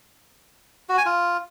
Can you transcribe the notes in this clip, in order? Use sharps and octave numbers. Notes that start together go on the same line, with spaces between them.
F#4
G#5
F4